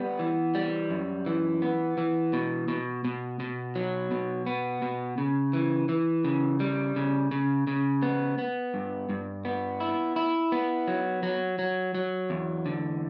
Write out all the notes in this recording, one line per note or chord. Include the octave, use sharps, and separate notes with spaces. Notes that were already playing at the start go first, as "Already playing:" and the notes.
Already playing: G3 B3
E3
G3
F#2
E3
B3
E3
B2
B2
B2
B2
F#3
B2
B3
B2
C#3
E3
E3
C#3
G3
C#3
C#3
C#3
B3
B3
G2
G2
B3
E4
E4
B3
F#3
F#3
F#3
F#3
E2
D3